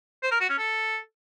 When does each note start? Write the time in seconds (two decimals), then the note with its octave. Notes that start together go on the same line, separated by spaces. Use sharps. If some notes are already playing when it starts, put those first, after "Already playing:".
0.23 C5
0.32 A#4
0.40 F#4
0.49 C#4
0.58 A4